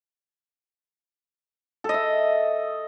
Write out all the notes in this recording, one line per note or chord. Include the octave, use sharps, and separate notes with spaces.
A4 D#5 E5